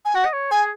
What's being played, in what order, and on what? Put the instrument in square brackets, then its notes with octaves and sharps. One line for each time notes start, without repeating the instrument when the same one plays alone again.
[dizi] G#5
[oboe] F#4 [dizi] F#5
[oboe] D#5
C#5
[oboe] G#4 [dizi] G#5